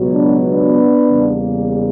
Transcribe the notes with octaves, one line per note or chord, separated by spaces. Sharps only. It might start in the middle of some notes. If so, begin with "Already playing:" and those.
Already playing: C#2 B2 F#3
B3 D4
B3 D4
E2 C#3 G3 A#3